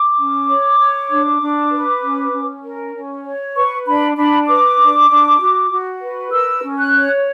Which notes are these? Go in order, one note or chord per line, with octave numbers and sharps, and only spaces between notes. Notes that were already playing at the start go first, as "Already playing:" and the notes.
Already playing: D6
C#4
C#5
C#5
D4
D4
B4
C#4
C#4
A#4
C#4
C#5
B4 C#6
D4 B5
D4 B5
B4 D6
D4
D4
F#4
F#4
B4
A#4 E6
C#4
F#6
C#5